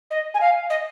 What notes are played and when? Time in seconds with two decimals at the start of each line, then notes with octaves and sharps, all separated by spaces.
0.10 D#5
0.34 G#5
0.40 F5
0.70 D#5